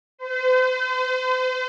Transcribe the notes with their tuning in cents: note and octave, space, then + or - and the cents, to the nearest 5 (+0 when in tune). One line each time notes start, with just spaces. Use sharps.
C5 -40